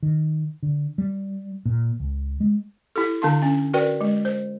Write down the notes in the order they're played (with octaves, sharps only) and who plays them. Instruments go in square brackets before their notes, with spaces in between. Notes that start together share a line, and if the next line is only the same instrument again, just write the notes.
[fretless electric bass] D#3
D3
G3
A#2
C#2
G#3
[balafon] E4 G4 A4
D3 D4 F5 A5 C6
C#4
F#4 A#4 B4 D5 G5
G#3
C5